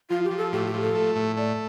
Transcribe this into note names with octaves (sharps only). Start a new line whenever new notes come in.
F3 F4
G4
F3
A4
A2 G4
G4
F3
A4
A3
A2
A3 D5